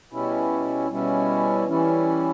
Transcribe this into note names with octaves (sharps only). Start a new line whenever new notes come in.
B2 G3 C#4 E4
B2 G3 C#4 E4
E3 G3 C#4 E4